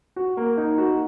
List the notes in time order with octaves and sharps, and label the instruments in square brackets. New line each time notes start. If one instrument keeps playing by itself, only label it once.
[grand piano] F#4
A#3
D#4
F#4